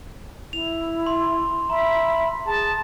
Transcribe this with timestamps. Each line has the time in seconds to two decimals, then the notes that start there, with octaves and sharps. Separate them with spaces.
0.53 E4 F7
1.06 C6
1.70 E5 A#5 B5
2.46 G#4 A5